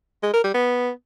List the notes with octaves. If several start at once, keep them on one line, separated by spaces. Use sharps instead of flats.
G#3
A#4
G3
B3